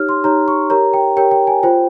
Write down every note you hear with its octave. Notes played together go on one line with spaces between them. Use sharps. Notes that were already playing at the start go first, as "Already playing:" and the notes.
Already playing: D#4 G4 C#5 F6
C6
D#4 G4 C#5 A#5
C#6
G4 A#4 C#5 A#5
G5
G4 A#4 C#5 G5
G5
G#5
F4 C5 G5